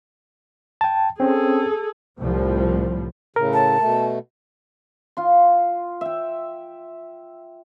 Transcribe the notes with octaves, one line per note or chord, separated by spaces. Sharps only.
G5 A5
C4 C#4 G#4 A4
C2 A2 F3 G3
A2 C#3 A#4
A5
B2 A3
F4 C6
E5 G5